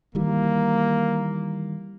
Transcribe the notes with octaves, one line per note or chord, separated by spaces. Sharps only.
D#3 E3 G3 A#3